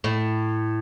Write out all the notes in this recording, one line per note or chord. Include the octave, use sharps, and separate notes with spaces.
A2